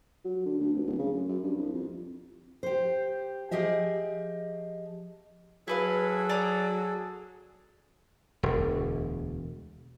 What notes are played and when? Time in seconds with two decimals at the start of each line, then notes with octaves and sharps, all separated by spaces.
0.25 F#3
0.45 D3
0.60 D2
0.73 F1
0.87 D1
0.98 C#3
1.13 F#2
1.29 F#2
1.43 G2
1.57 C2
1.73 F2
2.63 G4 C5
3.51 F3 G4 G#4 D#5 E5
5.68 F#3 E4 G#4 A4 B4 F5
6.29 D5 A#5 D#6
8.43 E1 D2